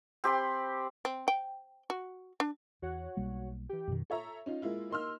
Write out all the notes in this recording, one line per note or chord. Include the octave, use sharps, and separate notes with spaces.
C4 G4 B5 C6
C4
G5
F#4
D4
E2 F#4 C#5 F#5
B1 G3 A#3
E3 G4
F#2 B2 D#3
A4 C#5 E5 A#5
C#4 D#4 F4
G#3 A#3 E4 F4
A#3 D#4 C6 E6 F6